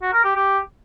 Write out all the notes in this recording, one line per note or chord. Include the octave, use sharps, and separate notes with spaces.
F#4
A#4
G4
G4